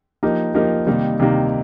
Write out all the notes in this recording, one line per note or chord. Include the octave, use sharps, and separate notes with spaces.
F3 A#3 D#4 G4 A#4
F3 A#3 D#4 G4 A#4
C3 D#3 G3 A#3 D#4
C3 D#3 G3 A#3 D#4